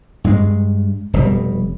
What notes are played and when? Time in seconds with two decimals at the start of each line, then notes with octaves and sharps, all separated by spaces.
0.24 G2 G#3
1.13 F1 B2 G3